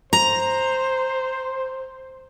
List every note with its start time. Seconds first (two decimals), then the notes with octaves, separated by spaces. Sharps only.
0.13 C5 A#5